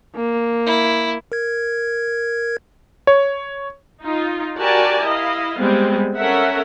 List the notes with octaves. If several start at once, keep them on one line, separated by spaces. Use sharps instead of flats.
A#3
E4
A#4 G#6
C#5
D#4 F4
F#4 G4 A#4 D5 G#5 A5
E4 D#5 F5
G3 G#3 B3 C4
C#4 A4 A#4 E5 F#5